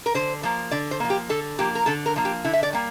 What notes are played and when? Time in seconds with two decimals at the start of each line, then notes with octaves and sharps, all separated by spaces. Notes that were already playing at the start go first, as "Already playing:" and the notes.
0.06 A#4
0.14 D3 C5
0.43 F3 A#3
0.71 D3 D5
0.91 C5
1.00 F3 A#3
1.10 G4
1.29 D3 A4
1.58 F3 A#3 G4
1.75 A#4
1.86 D3 A4
2.06 A#4
2.16 F3 A#3
2.25 G4
2.45 D3 E4
2.53 E5
2.63 D5
2.73 G3 A#3